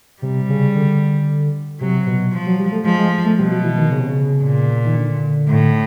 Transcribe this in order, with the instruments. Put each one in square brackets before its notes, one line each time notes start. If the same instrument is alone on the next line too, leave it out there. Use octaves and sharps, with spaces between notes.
[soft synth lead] C3 [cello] G3
[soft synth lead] C#3
D3
[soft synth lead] C3 [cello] F#3
[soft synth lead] B2
[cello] F3
[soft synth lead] F#3
G3
A3
[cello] F3 [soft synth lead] G#3
[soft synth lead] G#3
A3
[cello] B2 [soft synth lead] G3
[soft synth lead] F#3
E3
D#3
C#3
C3
C#3
[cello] A#2
[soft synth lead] D#3
D3
[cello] A2